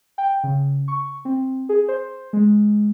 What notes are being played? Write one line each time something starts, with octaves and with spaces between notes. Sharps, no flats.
G5
C#3
C#6
C4
G#4
C5
G#3